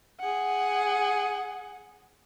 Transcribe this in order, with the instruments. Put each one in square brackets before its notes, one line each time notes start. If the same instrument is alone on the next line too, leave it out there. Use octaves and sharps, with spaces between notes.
[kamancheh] G#4 F#5